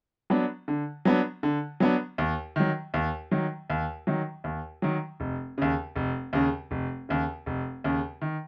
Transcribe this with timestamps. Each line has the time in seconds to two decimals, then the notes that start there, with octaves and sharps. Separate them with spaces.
0.30 F#3 B3 D4
0.68 D3
1.05 F#3 B3 D4
1.43 D3
1.80 F#3 B3 D4
2.18 D#2
2.56 D#3 F#3
2.94 D#2
3.31 D#3 F#3
3.70 D#2
4.07 D#3 F#3
4.44 D#2
4.82 D#3 F#3
5.20 F1
5.58 D#2 C#3
5.96 F1
6.33 D#2 C#3
6.71 F1
7.09 D#2 C#3
7.46 F1
7.84 D#2 C#3
8.22 D#3